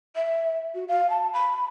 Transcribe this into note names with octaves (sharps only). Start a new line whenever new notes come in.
E5
F#4
F5
A5
B5